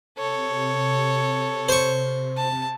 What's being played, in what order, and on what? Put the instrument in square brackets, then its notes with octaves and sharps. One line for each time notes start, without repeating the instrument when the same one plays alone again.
[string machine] C3 [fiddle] A4 C#5
[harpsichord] C5 C#6
[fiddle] A5